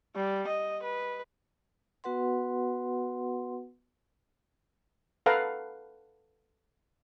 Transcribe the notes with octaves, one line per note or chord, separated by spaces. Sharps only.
G3
D#5
B4
B3 F#4 B4 F#5 C6
A4 B4 F5 F#5 A#5